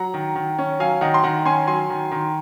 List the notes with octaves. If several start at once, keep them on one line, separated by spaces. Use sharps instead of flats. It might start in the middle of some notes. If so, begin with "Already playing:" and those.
Already playing: F#3 F#5 A#5
D#3
D#3
C#4
F#3 F5 G#5
D#3 D#5 F#5
C6
D#3 F#5 A#5
C#4 G#5 C6
F#3 G#5 C6
D#3
D#3